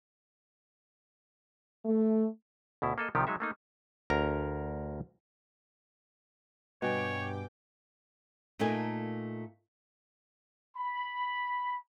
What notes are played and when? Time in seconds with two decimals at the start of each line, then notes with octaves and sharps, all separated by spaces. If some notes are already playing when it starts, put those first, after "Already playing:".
1.85 A3
2.82 D2 B2 E4
2.98 A#3 A4 D#5
3.15 C2 C3 D#3 F3 G4
3.27 F#3 G#3 D#4 E5
3.40 A3 A#3 D#4
4.10 D2 A#4 A#5
6.82 G2 B2 B4 C#5 G5 G#5 B5 D6
8.59 A#2 A3 A#3 D#4 A4 G#5
10.77 B5